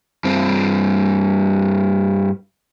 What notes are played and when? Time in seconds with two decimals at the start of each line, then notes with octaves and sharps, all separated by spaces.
0.24 G2 C4